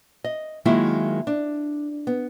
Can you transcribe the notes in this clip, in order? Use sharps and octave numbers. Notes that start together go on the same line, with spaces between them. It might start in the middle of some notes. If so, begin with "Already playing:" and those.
D#5
D#3 F#3 G#3 A#3 E4 F4
D4
B3